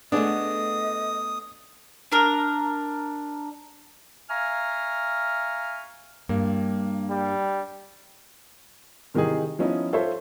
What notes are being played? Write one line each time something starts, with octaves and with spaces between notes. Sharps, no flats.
A3 B3 D4 G#4 D#5 D#6
D4 A#4
E5 F5 G#5 A#5 C#6 F6
G2 A#3
G3
C3 D#3 E3 D#4 G4 G#4
F3 B3 C#4 D#4 E4
F4 A4 C5 C#5 E5